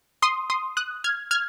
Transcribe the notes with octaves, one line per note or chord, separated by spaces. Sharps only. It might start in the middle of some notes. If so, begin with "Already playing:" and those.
C6 D#6
C6 D#6
D#6 F#6
F6 G#6
F6 G#6